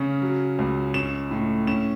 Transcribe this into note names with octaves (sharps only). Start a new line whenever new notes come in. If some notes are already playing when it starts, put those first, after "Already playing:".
Already playing: C#3 C#4
F#3
C#2
C#4 E7
A2
C#4 E7